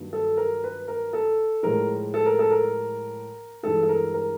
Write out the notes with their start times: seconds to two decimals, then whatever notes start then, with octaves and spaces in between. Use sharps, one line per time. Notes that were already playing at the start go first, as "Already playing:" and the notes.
Already playing: G2 D#3 F#3 A#3 D4
0.13 A4
0.37 A#4
0.64 B4
0.88 A#4
1.13 A4
1.63 A2 F3 G#3 A#4
2.14 A4
2.26 A#4
2.39 A4
2.51 A#4
3.63 G2 E3 G#3 A4
3.83 A4
3.89 A#4
4.14 A#4